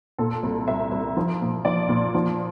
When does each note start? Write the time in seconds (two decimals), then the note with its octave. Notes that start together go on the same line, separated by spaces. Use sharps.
0.18 A#2 A4
0.43 C2
0.68 C2 E5
0.91 C2
1.17 F3
1.41 A#2
1.65 F3 D5
1.89 A#2
2.15 F3